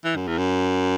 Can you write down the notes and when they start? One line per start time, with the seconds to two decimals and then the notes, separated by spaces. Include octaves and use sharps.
0.04 E3
0.16 F#2
0.27 E2
0.38 F#2